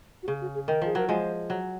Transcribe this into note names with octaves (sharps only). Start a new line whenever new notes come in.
F#4
C#3 G#4
F#4
G#4
D#3 A#4
F3 G#4
F#3 A#4
F3 G#3 C5
F#3